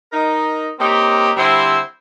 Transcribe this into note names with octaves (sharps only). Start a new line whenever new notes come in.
D#4 A#4 D#5
A#3 C4 C#4 D#4 G4
D3 G3 C4 E4 C5